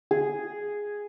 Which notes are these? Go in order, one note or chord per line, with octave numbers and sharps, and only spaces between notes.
G#4